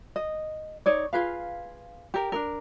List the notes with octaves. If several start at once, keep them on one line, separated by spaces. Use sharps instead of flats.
D#5
D#4 C#5 D5
F4 G#4 B4 F5
G4 A#4
D4 D#4 A#4